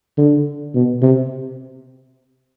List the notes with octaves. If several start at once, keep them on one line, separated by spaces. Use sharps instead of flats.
D3
B2
C3